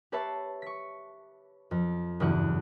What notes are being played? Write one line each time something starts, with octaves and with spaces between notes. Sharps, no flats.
G4 B4 C#5 E5 A5 C7
C#6 B6
F2
F#1 E2 G2 F#4 F#6